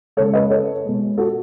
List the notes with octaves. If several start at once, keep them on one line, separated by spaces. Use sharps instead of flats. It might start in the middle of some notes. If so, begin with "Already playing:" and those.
C#3 G#3 A4 C#5
B4 D#5
A4 C#5
B2 G#3
F#4 A4